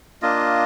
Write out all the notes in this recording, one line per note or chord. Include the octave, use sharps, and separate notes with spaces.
A#3 D4 F4 D#5